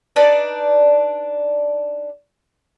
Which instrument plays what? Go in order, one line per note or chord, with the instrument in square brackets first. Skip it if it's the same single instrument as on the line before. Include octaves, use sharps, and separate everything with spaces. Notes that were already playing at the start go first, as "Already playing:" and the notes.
[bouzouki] D4 D#4 B4 D5